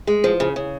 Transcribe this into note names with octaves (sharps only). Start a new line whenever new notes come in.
G#3
F3
C#3
C#3